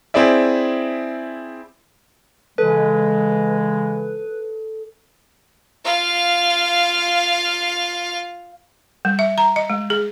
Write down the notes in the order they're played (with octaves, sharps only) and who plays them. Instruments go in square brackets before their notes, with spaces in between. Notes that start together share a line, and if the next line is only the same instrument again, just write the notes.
[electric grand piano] C4 E4 G#4 D5 E5
[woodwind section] C#3 E3 G#3 [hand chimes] A4 [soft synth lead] B4
[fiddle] F4 F5
[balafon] G3
E5
A#5
D#5
G#3
G#4